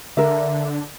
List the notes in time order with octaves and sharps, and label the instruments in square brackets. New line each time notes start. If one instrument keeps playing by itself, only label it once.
[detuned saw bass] D3 [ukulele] A#4 E5